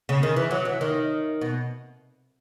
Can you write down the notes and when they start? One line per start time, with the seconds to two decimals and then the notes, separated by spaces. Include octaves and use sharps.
0.09 C#3
0.23 D#3
0.36 E3
0.51 F#3
0.65 E3
0.81 D#3
1.41 B2